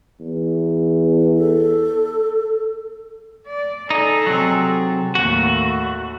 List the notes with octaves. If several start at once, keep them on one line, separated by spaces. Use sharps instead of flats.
E2
A4
D5
D#4 G#4 A4
C3 F#3
D#2 A2 F#4